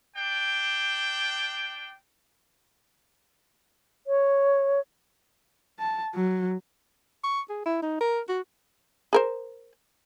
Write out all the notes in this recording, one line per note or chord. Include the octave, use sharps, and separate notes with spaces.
D4 G5
C#5
A5
F#3
C#6
G#4
E4
D#4
A#4
F#4
G#4 A#4 C5